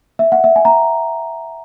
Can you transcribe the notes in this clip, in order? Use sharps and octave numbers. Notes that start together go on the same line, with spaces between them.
E5
F#5
E5
G#5
A#5